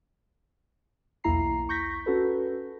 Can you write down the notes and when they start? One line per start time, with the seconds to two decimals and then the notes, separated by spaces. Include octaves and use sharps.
1.24 B1 E2 A#3 E4 A#5 C7
1.69 C#6 G6 A#6 B6
2.06 C#4 F#4 A4 B4